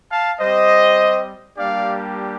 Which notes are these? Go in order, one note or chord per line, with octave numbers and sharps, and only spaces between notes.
F5 A5
G3 C4 G4 C5 D#5
G3 A#3 D4 G4 D5 F5